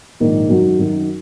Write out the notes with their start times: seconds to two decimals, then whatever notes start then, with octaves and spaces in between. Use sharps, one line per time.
0.20 A#1 G#2 D#3 A#3
0.49 F#2 D#3 F#3
0.79 F#2 D#3 F#3